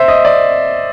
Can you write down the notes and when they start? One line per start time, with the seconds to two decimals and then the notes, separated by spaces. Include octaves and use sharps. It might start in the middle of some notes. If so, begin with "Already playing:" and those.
Already playing: C5 E5
0.08 D#5
0.25 D5